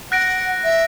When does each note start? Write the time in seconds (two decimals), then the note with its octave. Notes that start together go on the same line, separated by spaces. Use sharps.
0.12 F#5 F#6 A#6 D7
0.64 E5